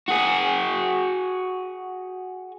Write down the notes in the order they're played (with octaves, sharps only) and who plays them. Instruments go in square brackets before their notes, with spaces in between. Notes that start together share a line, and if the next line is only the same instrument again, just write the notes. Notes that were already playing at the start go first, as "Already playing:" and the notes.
[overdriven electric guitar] F#4 G#4